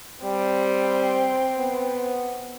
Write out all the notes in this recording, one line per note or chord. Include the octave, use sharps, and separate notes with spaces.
G3 C4
B3